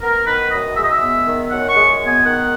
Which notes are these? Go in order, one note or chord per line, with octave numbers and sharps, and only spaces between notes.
B3 A#4
D#3 B4
F#2 D#5
G#3 E5
D#5
E5
B3
D#3
F#2 F#5
C#6
G#3
B3
G#5
D#3 F#5